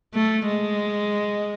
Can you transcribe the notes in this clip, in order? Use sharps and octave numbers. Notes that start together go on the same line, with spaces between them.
A3
G#3